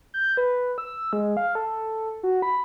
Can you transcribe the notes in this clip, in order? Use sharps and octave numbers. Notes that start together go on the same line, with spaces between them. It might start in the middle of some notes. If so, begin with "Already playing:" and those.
G6
B4
E6
G#3
F5
A4
F#4
B5